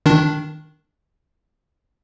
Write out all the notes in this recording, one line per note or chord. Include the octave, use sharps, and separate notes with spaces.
D#3 D4